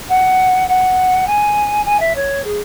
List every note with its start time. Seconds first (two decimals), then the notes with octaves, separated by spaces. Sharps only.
0.09 F#5
0.68 F#5
1.26 G#5
1.85 G#5
1.99 E5
2.15 C#5
2.44 G#4